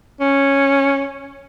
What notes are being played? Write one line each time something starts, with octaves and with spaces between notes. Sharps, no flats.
C#4